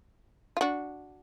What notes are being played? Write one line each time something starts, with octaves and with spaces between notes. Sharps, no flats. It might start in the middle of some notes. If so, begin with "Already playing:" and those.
F4
D4 F#4